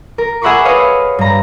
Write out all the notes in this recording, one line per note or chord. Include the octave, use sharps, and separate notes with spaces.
A#4
G#4 E5 F#5 B5 C#6 D6
B4 C#5 D#5 F5
G2 A#5